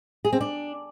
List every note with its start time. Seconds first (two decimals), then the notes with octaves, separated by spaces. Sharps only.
0.25 G#4
0.33 C4
0.41 D4